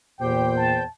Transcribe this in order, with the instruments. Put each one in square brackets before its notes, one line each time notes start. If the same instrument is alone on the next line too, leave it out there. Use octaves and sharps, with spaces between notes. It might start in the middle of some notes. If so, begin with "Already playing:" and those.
[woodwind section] E2 E3 C5 [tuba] A#2 [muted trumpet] G4 [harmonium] G5
[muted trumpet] A5